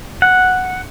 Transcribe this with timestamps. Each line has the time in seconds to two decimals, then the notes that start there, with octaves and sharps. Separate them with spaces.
0.22 F#5